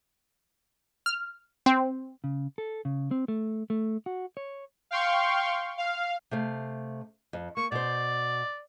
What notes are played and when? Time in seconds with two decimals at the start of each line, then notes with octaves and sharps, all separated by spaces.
1.06 F6
1.66 C4
2.24 C#3
2.58 A4
2.85 C#3
3.11 C4
3.28 A3
3.70 A3
4.06 F#4
4.37 C#5
4.91 F5 G5 C6 C#6
5.78 F5
6.31 C3 A3 F5
7.33 F2
7.57 A#3 C#6
7.72 B2 C5 D5